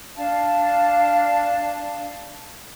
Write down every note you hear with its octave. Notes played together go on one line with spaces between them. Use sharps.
D4 F5 A5